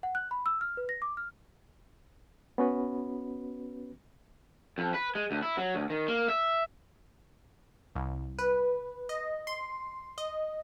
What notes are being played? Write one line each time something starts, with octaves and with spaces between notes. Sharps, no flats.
F#5
F#6
B5
E6
F6
B4
A#6
D6
F6
B3 C#4 F#4 B4
F2
B4
G#3
D2
E4
F#3
D2
D#3
A#3
E5
C2
B4
D#5
C6
D#5